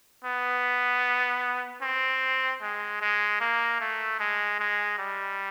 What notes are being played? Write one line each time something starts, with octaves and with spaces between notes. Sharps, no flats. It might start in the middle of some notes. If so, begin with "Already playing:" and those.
B3
C4
G#3
G#3
A#3
A3
G#3
G#3
G3